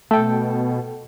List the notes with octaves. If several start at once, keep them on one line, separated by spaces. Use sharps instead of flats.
B2 A3 A4 G5